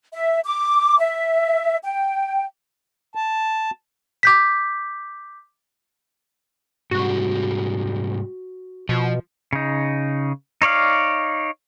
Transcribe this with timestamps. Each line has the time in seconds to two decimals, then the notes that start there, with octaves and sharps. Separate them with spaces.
0.13 E5
0.45 D6
0.99 E5
1.84 G5
3.15 A5
4.23 D6 G6 B6
6.91 G#2 C3 G3 F#4
8.89 B2 F3
9.53 C#3 D#4
10.62 D#4 C#5 D5 F5